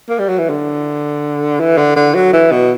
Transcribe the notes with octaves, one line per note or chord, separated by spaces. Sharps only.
A#3
G3
F#3
E3
D3
E3
D3
D3
F#3
E3
B2